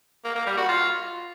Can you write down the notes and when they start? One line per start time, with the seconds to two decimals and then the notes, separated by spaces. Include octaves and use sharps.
0.24 A#3
0.35 A#3
0.46 G3
0.58 F#4
0.69 F4